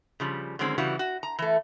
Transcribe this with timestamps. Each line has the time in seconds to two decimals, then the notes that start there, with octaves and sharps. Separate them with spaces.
0.20 C#3 F3 G3
0.59 D3 D#3 F#3 G#3 C4 C#4
0.78 C#3 E3 G3 F#4
0.99 F#4
1.23 A#5
1.39 E3 A3